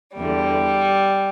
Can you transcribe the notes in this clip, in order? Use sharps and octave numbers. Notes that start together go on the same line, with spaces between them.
E2 D3 G3